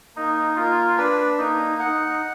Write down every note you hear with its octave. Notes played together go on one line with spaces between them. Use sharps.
A#3 D#4
A#3 F4
D4 B4
A#3 D#4
D#4 F#5